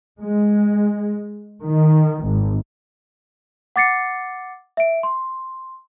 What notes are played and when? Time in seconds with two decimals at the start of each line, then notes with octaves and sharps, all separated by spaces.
0.20 G#3
1.63 D#3
2.25 G#1
3.76 F#5 D6 A6 C7 C#7
4.77 E5 D7
5.03 C6